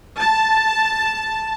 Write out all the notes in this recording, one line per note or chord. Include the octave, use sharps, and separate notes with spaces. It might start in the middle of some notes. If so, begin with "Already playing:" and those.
A5